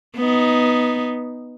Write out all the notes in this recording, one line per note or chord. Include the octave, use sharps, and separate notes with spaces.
B3 D#4